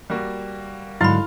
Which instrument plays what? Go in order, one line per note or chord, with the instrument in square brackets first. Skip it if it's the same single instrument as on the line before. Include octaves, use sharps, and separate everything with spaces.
[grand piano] G3 A#3 F#4
[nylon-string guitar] G#2 D3 F#3 [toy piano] E4 B5 [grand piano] F5 C6 F6